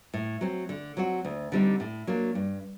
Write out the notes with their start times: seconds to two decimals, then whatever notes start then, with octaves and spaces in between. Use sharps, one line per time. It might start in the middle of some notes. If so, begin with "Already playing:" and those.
0.14 A2
0.41 F#3 C4
0.69 D3
0.97 F#3 C4 F#4
1.25 D2
1.52 D3 G3 C4 D#4
1.80 A2
2.07 F#3 A#3 D4
2.35 G2